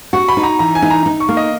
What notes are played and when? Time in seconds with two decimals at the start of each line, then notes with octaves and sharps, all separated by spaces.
0.13 F#4 C#6
0.28 B5
0.37 D#4
0.43 A#5
0.59 E3 A#5
0.75 G#5
0.82 D#4
0.91 A#5
1.06 D#4
1.20 C#6
1.29 A#3
1.37 D#5